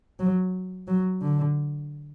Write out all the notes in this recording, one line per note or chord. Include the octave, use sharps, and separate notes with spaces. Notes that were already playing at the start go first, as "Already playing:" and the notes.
F#3
F#3
D3